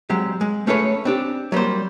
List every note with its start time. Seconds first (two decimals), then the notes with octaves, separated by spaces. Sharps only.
0.10 F#3 G#3 C4 G4
0.41 G#3
0.67 A3 C#4 G#4 A4 B4 C#5
1.05 C4 D4 G4
1.52 F#3 G3 A#3 C5